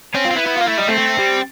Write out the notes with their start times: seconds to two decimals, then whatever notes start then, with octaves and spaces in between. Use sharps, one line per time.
0.15 C4 C#4
0.25 F4
0.31 C4
0.36 B3 E4
0.47 E4
0.57 A#3 F4
0.67 A3 E4
0.78 G3 D#4
0.88 A3 C4
0.99 A3
1.19 G3